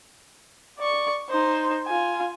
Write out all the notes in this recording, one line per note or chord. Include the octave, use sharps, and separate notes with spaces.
D5 C#6
D#4 C5
F4 G#5